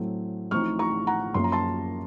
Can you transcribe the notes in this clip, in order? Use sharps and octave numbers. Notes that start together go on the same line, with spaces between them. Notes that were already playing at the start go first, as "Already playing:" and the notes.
Already playing: A2 F#3 A3 C4
A1 A2 F3 C4 D#4 C#6 F6
A#5 C#6
F#5 A#5
F#2 F3 A#3 C6
A#5
A5 C6